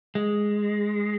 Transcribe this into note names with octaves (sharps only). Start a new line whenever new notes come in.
G#3